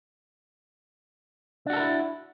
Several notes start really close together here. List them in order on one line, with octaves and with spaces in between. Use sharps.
D4 F#4 A4 A#4 E4